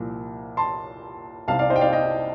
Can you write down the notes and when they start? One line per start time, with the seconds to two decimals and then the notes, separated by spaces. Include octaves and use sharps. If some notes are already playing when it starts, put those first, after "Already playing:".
Already playing: C2 A#2 F3
0.57 A5 C6
1.48 C2 C3 G3 F5 A5
1.59 D5 F5
1.70 C5 D#5
1.76 G5
1.81 D5 F5
1.93 D#5 G5